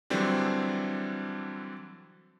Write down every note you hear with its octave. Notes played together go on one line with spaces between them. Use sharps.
D3 E3 F#3 G3 C4 D4